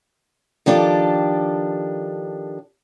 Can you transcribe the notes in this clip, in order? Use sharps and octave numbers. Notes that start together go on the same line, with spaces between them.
D#3 F3 D4 G4 A4